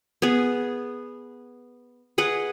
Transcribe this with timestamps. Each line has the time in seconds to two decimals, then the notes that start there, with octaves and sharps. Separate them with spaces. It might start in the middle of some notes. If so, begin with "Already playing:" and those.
0.22 B3 G#4
2.18 G#4 B4 D#5 F#5